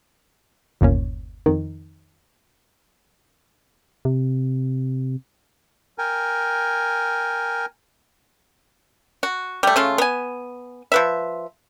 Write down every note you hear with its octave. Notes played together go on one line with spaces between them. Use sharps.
G1 D#2 A#2 C#4
F2 D#3
C3
A#4 G5 G#5
F#4
G3 A3
C#3 A3 F4
B3 G#5
F3 B4 E5